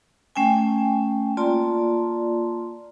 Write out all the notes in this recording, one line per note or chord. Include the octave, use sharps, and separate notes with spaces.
A3 C#4 G5 G#5
A#3 F4 D5 A5 C6